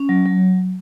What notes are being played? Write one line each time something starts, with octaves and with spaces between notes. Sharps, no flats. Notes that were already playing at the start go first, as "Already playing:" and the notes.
Already playing: C#4
F#3
F#3